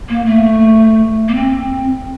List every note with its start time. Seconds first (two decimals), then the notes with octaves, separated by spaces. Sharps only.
0.09 A#3
0.26 A3
1.28 A#3
1.35 C4